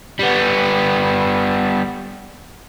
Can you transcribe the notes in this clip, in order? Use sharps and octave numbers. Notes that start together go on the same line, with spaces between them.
G3 B3